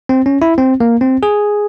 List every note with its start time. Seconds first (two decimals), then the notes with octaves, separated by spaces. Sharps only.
0.09 C4
0.26 C#4
0.42 E4
0.58 C4
0.80 A#3
1.01 C4
1.23 G#4